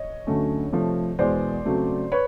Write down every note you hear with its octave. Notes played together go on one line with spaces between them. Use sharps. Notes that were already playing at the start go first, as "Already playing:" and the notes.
Already playing: C#5 D#5
D2 D3 F#3 A3 C#4
C3 F3 A3
E2 B2 G#3 C5 D5
C#3 F#3 A3 C4
B4 C#5